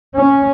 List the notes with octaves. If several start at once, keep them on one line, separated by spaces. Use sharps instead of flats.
C#4